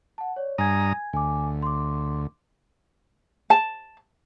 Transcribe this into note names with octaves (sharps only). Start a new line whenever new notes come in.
F#5 A5
C#5 D5
G2 G#5 A#5 D#6 G#6
D2 G#5 D6
C6 D6
A5